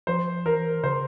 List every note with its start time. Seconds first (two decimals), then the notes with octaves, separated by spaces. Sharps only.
0.07 F3 C5
0.45 E3 A#4
0.83 C#3 C5